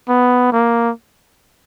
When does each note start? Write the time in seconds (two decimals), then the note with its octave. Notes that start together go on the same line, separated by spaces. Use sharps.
0.09 B3
0.52 A#3